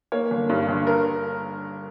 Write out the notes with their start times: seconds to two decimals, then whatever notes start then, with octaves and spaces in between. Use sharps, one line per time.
0.12 A#3 C#5
0.31 G1
0.49 G2
0.69 G1
0.87 A#4